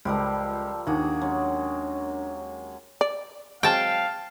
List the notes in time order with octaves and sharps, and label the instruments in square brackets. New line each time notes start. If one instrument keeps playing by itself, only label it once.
[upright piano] C#2 [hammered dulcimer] F3 G3 A#4 [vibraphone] D5 A5 E6
[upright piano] D#2 [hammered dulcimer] A#3 F#4 G#4 [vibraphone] D4
[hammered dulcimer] F#3 G#3 C#4
[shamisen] D5
[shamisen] F#3 G#3 C4 [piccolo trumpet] F5 [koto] G5 A5